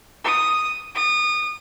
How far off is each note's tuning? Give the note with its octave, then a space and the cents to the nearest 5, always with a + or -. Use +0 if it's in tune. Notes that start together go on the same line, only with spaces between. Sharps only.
D#6 -5
D#6 -30